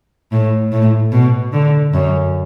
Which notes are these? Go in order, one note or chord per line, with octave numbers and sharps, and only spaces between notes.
A2
A2
B2
D3
F#2